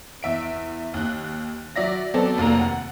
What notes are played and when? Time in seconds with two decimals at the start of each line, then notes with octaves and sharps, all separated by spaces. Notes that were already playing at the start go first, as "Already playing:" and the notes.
0.23 E2 E5 D7
0.94 D#2 F#6
1.76 F#3 D5 E5 A#6
2.14 F#3 B3 C4 A4 D5
2.38 F1 D#2 A#3 A#5
2.60 F#5